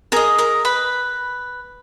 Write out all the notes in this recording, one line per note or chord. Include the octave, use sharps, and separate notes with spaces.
G#4 A#4 D#5 A#5
A#4 A#5
B4 B5